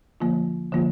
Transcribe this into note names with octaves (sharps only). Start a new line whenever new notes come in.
D3 F3 A#3 F4
D3 F3 A#3 F4